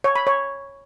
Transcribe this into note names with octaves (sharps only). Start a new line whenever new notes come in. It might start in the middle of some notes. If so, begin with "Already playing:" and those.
C#5
B5
C#5